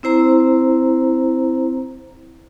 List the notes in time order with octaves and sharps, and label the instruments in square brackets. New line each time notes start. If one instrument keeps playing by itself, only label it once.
[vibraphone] C4 E4 C5 A#5